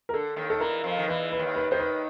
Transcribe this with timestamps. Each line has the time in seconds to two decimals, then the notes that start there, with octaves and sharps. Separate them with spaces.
0.09 A#4
0.14 D3 A4
0.36 D#2 D#3
0.50 A4
0.60 E2 E3 A#4
0.84 F2 F3
0.98 D#3
1.08 E2 E3 B4
1.32 B4
1.39 D#2 D#3
1.56 B4
1.71 D#2 D#3 C5
1.80 B4